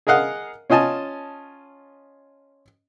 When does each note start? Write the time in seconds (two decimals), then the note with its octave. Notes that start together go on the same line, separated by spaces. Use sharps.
0.07 G#4 A#4 D#5 F5 F#5
0.70 C#4 F4 D#5 G#5 A5